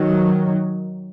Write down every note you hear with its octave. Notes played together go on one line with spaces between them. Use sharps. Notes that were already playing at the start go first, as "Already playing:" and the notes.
Already playing: D#3 F#3